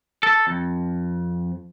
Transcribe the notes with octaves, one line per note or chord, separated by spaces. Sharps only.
A4
F2